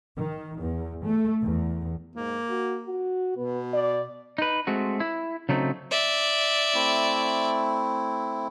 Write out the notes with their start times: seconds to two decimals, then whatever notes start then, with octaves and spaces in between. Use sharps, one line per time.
0.16 D#3
0.59 E2
1.05 A3
1.42 E2
2.16 G#2 A#3
2.49 F#4
2.86 F#4
3.37 B2 B3
3.74 D5
4.38 D#4 B4
4.67 G#3 A3 C4 F#4
5.00 E4
5.49 C#3 F#3 A3 C4 D#4
5.91 D5 E5
6.75 A3 C4 E4